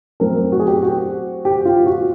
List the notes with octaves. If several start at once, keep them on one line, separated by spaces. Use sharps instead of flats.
F#3 A3 C4 A#4
F#4
G#4
G4
F#4
G4
F4
F#4